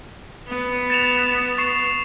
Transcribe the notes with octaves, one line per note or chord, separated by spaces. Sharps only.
B3
A6 E7 F7
C#6 C7 E7